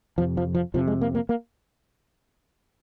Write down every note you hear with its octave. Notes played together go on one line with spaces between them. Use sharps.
F2 C3 F3
F3
F3
F2 C3 F3
G#3
A#3
A#3
A#3